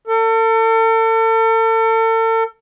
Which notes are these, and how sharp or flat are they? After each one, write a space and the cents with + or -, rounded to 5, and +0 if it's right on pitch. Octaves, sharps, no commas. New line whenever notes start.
A4 +40